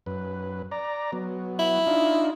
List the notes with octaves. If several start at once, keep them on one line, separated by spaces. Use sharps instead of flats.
F#2 B4
D5 A#5
F#3 B3
E4
D4 D#4 F4